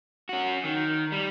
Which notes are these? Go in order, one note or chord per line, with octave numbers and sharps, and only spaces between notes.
C#4 F#4
D#3
G3